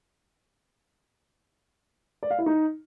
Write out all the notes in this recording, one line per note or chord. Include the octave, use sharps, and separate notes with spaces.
D5
F5
E4
D#4